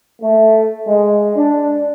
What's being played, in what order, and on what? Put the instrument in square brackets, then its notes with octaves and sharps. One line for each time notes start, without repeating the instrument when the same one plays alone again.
[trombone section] A3
G#3
D4